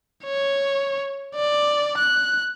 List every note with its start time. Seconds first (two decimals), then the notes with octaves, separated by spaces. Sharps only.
0.25 C#5
1.36 D5
1.98 F#6